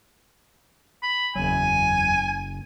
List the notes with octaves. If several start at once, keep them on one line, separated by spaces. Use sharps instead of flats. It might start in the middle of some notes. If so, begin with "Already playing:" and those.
B5
F#1 E2 F#3 G#5